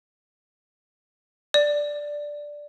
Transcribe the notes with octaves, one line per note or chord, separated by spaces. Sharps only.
D5